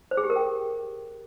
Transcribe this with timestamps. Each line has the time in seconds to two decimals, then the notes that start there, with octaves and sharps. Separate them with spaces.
0.11 C5
0.17 G#4
0.24 G4
0.30 A#4
0.36 G5